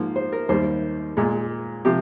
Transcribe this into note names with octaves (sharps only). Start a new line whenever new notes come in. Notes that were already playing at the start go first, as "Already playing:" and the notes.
Already playing: G#2 F3 A#3
C5
A#4
D#2 D#3 G3 A#3 C5
A#2 G#3
C3 F3 G4